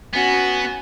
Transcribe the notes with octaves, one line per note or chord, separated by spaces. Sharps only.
B3 C#4 F#4